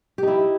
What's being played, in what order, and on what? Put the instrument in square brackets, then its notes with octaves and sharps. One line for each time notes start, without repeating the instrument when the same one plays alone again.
[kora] G4
D#4
E4